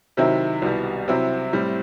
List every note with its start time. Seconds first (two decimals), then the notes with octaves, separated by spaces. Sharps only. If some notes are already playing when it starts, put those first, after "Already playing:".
0.17 C3 D#3 F#3 C4 E4
0.62 C2 B2 G3
1.08 C3 F#3 C4 E4
1.53 A2 G3 C4